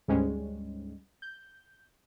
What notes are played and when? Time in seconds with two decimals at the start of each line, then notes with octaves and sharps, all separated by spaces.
0.08 D2 G#2 G3 G#3 C#4
1.22 G6